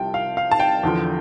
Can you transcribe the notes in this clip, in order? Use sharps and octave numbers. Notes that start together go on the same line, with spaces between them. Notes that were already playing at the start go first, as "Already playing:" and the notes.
Already playing: C2 C3 F3 G5 A5
F5
F5
A5
G5
E2 D3 F3